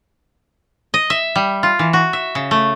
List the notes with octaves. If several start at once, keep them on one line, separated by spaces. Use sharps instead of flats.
D#5
E5
G3
F4
E3
F#4
E5
C#3
A3